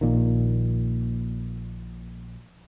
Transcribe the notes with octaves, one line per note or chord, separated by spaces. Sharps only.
A#1 A#2 D#3